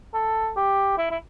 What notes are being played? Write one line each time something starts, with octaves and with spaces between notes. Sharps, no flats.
A4
G4
E4
E4